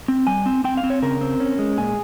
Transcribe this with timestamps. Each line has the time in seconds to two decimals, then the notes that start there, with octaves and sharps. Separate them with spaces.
0.08 C4
0.27 G3 G#5
0.46 C4
0.64 C4 G5
0.77 F5
0.83 C4
0.90 C#5
1.02 C#3 A#4
1.21 C4
1.40 C#4
1.59 G#3
1.77 A#2 G#4